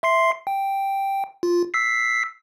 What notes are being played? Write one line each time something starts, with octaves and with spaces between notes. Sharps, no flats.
E5 C6 C7
G5
F4
E6 B6 C7